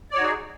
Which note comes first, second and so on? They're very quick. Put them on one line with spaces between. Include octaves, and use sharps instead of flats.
D5 C#5 F#4 D#4 G#4